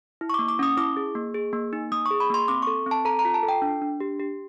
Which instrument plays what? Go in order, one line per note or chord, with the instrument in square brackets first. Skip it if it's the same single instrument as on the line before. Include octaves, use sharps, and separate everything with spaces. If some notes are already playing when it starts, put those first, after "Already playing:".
[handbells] E4
C#6
D6
A#3
D6
C#4 D#6
E4 D6
G#4
A#3
G#4
A#3
D#4
A#3 D#6
C#6
G#4
B5
A#3 C6
C4 D6
C#6
A4
C4 A5
A4 A#5
A#5
F4
A5
A4
G5
D4
D4
G4
G4